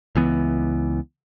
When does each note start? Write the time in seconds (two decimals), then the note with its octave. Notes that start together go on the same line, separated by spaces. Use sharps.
0.15 C#2 E3 B3